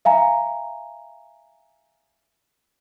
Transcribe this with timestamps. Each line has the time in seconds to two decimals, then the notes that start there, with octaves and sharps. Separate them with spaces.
0.05 E5 F5 G#5 A#5